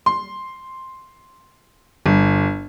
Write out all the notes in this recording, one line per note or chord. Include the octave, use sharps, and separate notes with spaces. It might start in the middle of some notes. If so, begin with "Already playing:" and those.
C6
G1